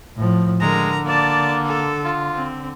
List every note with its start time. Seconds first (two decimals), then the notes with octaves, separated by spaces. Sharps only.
0.16 A2 F3
0.61 D3 G#3 A#4 A#5
1.06 A#3 D5 A5
1.64 A4
2.05 F4
2.34 C4